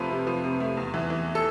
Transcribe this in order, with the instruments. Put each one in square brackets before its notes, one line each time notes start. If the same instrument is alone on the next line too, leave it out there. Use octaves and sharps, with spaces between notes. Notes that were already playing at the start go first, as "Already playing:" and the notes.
Already playing: [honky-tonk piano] F2 C3 F3 A3 B4
C3
F3
C3
A3
E2
E3
E3
A4